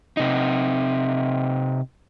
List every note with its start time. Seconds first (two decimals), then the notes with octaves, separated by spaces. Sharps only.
0.17 C3 D#4